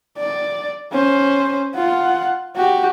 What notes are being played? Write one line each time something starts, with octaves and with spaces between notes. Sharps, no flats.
D5
C#4 C5
F4 F#5
F#4 G4